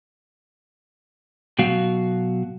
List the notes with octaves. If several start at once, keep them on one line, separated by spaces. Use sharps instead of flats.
B2 F#3 F#4 F5